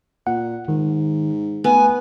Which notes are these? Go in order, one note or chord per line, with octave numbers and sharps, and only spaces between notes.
A#2 F#5
G#2 D#3
A3 B3 G#5